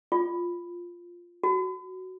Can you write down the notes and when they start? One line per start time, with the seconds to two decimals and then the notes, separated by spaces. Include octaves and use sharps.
0.12 F4
1.43 F#4